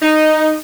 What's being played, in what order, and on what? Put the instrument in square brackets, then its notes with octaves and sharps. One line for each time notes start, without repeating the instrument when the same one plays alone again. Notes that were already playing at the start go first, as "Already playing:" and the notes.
[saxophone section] D#4